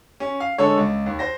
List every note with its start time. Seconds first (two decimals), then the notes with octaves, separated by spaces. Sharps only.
0.20 C#4
0.40 F5
0.58 D3 G#3 A4 C#5
0.78 C#2
1.06 D#2
1.19 C5 A#6